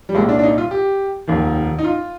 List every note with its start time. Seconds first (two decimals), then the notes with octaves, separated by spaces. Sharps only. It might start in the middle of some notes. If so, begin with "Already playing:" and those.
0.09 G3
0.15 C2 A#2 G#3
0.29 D4
0.39 D4
0.43 D#4
0.58 F4
0.71 G4
1.27 F1 D#2 D#3
1.79 D#4
1.84 F4